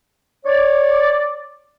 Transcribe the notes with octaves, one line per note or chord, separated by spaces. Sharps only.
C#5 D5